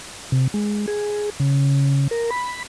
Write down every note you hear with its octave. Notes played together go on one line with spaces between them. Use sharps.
C3
G#3
G#4
C#3
A#4
B5